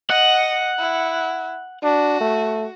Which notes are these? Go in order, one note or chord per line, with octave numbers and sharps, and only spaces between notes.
D#5 F#5
E4
D4 F#4
A3